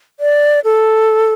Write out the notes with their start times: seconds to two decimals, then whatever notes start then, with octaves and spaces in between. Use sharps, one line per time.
0.20 D5
0.64 A4